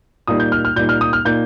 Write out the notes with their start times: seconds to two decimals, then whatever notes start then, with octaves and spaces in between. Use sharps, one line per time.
0.27 A#2 G3 A#3 D#4 D#6
0.40 G6
0.52 F6
0.65 F6
0.76 A#2 G3 A#3 D#4 G6
0.89 F6
1.01 D#6
1.13 F6
1.25 A#2 A#3 D#4 G6